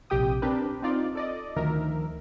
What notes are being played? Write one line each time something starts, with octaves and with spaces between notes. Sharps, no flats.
A#1 C3 G4 G5 D#6
C4 D4 G4 A#4 B4
C4 D#4 F4 D5
A4 D5 D#5
D2 D#3 F3 A#4 E5